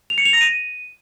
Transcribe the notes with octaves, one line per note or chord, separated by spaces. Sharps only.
F7
C#7
F7
A#6
D#7